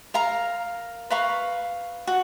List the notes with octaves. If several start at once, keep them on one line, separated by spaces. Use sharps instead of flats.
A#4 F5 A#5
B4 F5 A#5 C#6
F#4